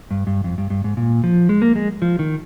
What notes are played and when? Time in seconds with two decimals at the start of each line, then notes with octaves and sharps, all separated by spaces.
0.11 G2
0.27 G2
0.44 F2
0.58 G2
0.70 G2
0.84 G#2
0.97 A#2
1.24 F3
1.49 G#3
1.62 A#3
1.76 G#3
2.02 F3
2.19 D#3